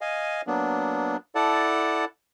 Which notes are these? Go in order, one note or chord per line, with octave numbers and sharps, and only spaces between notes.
D#5 F5 G#5
F#3 A#3 B3 D4
E4 A4 D5 F#5 A5